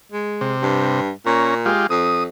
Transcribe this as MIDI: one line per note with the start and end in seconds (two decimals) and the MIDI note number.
0.12 0.53 56
0.41 1.01 48
0.63 1.11 43
1.26 1.70 46
1.26 1.55 61
1.26 1.55 82
1.66 1.87 56
1.66 1.87 65
1.66 1.87 67
1.90 2.27 41
1.90 2.24 87